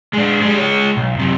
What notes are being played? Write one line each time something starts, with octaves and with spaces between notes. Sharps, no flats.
G#3 D4
G3 G#3
G#3 C#5
B1
F#2 C3